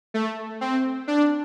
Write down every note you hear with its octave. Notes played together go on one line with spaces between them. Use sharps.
A3
C4
D4